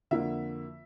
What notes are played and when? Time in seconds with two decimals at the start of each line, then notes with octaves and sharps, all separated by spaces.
0.11 F2 D3 F3 A#3 E5